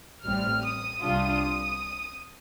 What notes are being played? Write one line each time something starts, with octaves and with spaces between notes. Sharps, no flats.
A1 A2 G3 C4 F6
D#6
C2 C3 G3 D4 F4 D#6